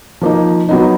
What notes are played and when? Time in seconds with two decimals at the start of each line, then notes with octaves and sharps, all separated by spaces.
0.21 F3 A#3 D#4
0.69 F#3 B3 D#4